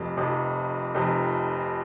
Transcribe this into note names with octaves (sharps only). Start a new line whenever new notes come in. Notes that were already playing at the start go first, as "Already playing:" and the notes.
Already playing: F1 F2 C3
F1 F2 C3
F1 F2 C3